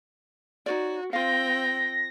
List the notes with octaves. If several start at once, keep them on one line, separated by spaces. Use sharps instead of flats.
D#4 F#4 C#5 D5
C4 F4 F5 G5 A#6